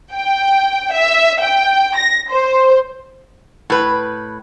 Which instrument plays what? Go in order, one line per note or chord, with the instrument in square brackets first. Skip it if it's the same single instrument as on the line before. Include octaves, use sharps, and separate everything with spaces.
[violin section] G5
E5
G5
A#6
C5
[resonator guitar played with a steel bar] A2 B4